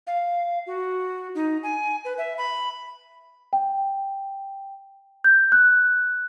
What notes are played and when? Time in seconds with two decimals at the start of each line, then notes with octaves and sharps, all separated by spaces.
0.07 F5
0.67 F#4
1.35 D#4
1.63 G#5
2.05 B4
2.18 E5
2.38 B5
3.53 G5
5.24 G6
5.52 F#6